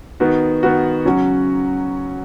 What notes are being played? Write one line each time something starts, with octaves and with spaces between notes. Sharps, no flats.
D#3 B3 F#4
D#3 B3 F#4
C#3 F#3 C#4 F#4